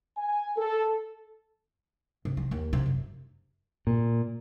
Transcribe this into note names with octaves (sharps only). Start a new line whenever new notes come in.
G#5
A4
C3
F3
D#2
C3
F#2
A#2